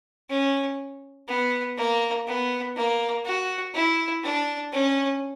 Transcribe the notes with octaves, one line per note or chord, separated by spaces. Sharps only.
C#4
B3
A#3
B3
A#3
F#4
E4
D4
C#4